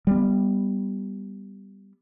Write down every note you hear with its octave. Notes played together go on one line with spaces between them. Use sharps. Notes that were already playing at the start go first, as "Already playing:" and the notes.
G3 B3